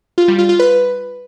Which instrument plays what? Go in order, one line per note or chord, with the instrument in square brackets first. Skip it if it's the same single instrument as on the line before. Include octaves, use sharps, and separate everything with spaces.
[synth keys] F4
G3
F4
F4
B4